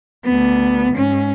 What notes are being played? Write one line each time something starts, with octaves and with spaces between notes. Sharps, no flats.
D2 B3
G#2 C#4